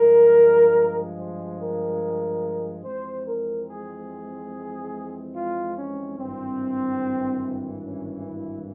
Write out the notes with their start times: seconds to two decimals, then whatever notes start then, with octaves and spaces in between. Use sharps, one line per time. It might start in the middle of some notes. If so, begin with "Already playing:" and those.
Already playing: G2 F3 G#3 A#4
1.18 C5
1.59 A#4
2.84 F2 E3 G#3 C4 C5
3.26 A#4
3.68 G#4
5.34 F4
5.76 C#4
6.18 G#1 G2 E3 C4
7.85 C#4
8.26 E4